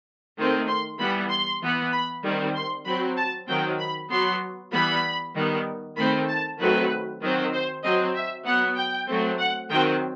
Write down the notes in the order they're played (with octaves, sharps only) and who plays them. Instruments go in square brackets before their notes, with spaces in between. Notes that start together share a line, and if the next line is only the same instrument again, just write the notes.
[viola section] D#3 A3 C4
C6
E3 G3 B3 B5
C6
E3 B3
B5
D#3 G3 C4
C6
F#3 C4 B5
A5
D#3 F#3 C4 G5
B5
F#3 B3 C6
E3 G3 B3 B5
D#3 G3 B3
D#3 A3 C4 B5
A5
D#3 F#3 A3 C4 B4
D#3 F#3 C4
C5
F#3 C4 D#5
E5
F#3 B3 F#5
G5
F#3 A3 C4
F#5
D#3 F#3 C4 G5